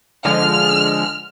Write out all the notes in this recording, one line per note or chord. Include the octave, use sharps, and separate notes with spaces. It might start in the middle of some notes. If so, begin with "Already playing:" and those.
D3 F3 G#3 F6